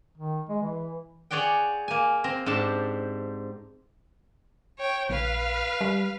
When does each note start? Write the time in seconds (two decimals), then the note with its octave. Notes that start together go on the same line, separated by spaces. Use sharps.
0.18 D#3
0.49 G#3
0.62 E3
1.31 G#4 C#5 D5 F#5 G5
1.88 A#3 G#5
2.24 C4 A#5
2.46 G#2 D4 G4 C5 A5
4.79 C#5 G5
5.09 A#1 B4 F5
5.81 G3